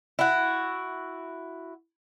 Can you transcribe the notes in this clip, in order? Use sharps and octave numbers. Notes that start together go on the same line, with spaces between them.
E4 F#4